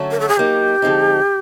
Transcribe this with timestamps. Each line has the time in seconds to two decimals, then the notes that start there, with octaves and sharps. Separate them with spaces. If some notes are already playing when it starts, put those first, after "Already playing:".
Already playing: D3 F#3 A3 C#4 F#4
0.11 A#4
0.20 A4
0.29 G#4
0.37 F#3 A#3 D#4 G4
0.82 D3 F3 G#3 C4 D#4